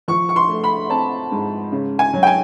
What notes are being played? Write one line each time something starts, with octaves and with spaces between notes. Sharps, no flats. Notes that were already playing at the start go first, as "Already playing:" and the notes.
F3 C#6
C#6
C6
A3
B5
C4 A5
G#2
C#3
G#5
F#3
G5
G#5